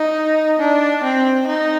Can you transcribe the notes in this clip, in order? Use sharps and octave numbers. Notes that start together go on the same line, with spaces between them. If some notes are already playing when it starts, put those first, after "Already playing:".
Already playing: D#4
D4
C4
D#4